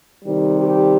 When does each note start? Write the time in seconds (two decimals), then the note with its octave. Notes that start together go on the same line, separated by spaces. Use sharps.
0.24 C3 D#3 G3
0.56 G4